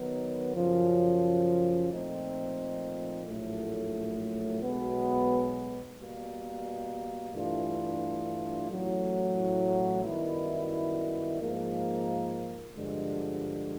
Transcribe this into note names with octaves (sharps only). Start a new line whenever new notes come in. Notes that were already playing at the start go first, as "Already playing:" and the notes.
Already playing: D#3 F#3 B3 D#4
F#2 C#3 F3
A#2 F3 A3 C4 D#4
A#1 A2 F#3 A3
B1 B2 G#3 B3
B2 G3 A#3
G2 E3 A3 D4 F4
A1 A2 F#3
F#2 D#3 G3 B3 E4
G#2 F3 A#3
G2 D3 F3 G#3